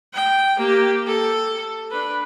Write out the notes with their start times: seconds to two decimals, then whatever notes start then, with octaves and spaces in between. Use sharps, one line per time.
0.14 G5
0.57 A#3 G4
1.08 A4
1.91 D4 B4